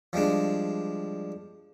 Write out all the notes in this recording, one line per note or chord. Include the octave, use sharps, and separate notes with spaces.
F3 G3 G#3 D4